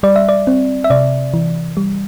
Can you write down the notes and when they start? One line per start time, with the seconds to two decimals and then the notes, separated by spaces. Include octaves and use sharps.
0.03 G3 D5
0.16 E5
0.29 D5
0.47 C4
0.84 E5
0.90 C3 D5
1.34 E3
1.77 G3